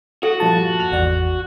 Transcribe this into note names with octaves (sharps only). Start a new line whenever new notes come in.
F#4 A4
G2 A#2 F3 A5
F7
G#1 E2 D5 F#5